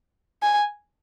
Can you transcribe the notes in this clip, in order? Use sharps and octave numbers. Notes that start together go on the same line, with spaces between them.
G#5